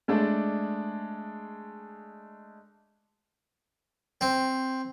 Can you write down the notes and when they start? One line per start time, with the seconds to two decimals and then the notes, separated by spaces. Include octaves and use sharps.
0.08 G#3 A3 D4 D5
4.21 C4